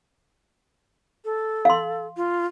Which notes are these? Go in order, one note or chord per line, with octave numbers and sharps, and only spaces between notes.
A4
F5 C6
F4